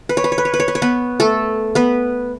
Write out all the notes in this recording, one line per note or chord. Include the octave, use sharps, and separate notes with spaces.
B4
C#5
B4
C#5
B4
C#5
B4
C#5
B4
C#5
B3 B4
A3 A4
B3 B4